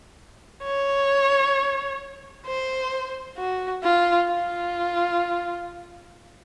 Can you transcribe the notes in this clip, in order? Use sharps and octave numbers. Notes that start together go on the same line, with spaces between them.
C#5
C5
F#4
F4
F4